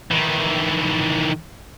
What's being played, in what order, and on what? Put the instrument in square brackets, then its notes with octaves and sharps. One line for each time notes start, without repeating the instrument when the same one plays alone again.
[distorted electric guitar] D#3 E3